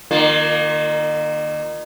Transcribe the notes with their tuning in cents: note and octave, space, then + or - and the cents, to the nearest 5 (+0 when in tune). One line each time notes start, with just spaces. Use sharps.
D#3 -35 A#3 +0 F4 +0